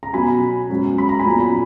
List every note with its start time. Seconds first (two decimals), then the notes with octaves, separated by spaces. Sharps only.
0.03 A#5
0.13 B2 F#3 B3 G#5 B5
0.69 G#2 F#3 C#4
0.98 B5
1.09 A#5
1.19 G#5 B5
1.25 A#2 F#3 B3